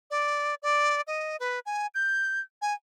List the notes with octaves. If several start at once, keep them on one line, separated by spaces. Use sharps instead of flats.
D5
D5
D#5
B4
G#5
G6
G#5